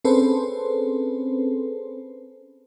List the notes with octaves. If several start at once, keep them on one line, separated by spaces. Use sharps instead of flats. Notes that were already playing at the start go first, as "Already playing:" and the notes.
C4 C#4 G#4 A4 B4 C5